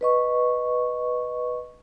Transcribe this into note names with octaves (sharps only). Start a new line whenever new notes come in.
B4 D#5 C#6